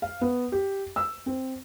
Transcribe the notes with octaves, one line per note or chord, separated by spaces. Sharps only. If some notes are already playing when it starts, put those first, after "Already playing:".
F5
B3
G4
E6
C4